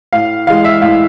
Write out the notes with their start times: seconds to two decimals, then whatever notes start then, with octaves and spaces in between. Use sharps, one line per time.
0.13 A2 F5
0.47 E3 G#3 F5
0.64 E5
0.82 A2 F5